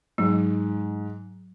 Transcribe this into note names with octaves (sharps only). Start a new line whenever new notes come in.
G#2 F#3